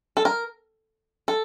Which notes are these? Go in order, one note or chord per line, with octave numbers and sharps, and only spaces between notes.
A4
A#4
A4